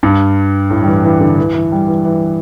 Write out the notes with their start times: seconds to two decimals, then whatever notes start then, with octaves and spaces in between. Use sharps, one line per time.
0.03 G2
0.70 A2
0.82 G3
0.87 E3
1.04 E3
1.21 D3
1.38 E3
1.55 E3
1.72 G3
1.88 E3
2.05 E3